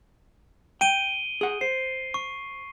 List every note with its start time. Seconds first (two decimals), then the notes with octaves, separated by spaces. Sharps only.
0.81 G5 D7 D#7 G7
1.41 G#4 F#5
1.61 C5 C7
2.14 C#6